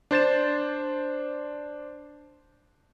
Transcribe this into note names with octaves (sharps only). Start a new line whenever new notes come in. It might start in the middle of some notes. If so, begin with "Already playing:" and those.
D4 C5 A6 E7